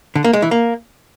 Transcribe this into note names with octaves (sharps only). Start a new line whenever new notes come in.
D3
A#3
G#3
E3
A#3